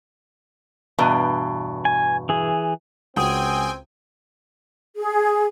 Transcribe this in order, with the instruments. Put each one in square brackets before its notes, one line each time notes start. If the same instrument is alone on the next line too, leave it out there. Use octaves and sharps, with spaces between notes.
[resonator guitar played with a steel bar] E2 G2 B2
[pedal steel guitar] G#5
E3 G#4
[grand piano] C#2 F#4 D#6 [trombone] C4 [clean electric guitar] G#4 [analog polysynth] G5 G#5
[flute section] G#4